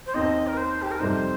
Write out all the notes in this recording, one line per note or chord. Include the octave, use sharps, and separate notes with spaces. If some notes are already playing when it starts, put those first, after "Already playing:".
C5
D#2 D#3 C4 D#4 D#5
A#4
C5
G4
A#4
F2 C3 G3 D#4 C5